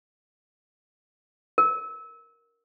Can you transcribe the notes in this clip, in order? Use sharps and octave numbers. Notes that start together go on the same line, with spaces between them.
A#4